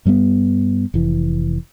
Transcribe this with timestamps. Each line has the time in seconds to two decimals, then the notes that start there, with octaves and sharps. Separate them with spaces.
0.05 G2 G3 A#3 B3
0.94 F1 E3